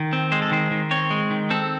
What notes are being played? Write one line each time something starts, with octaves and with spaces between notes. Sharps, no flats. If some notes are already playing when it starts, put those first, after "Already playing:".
Already playing: D#3
C4
G#3 C5
A4
D#3 C5
D#3
C4 C#5
G#3
D#3
C4 A4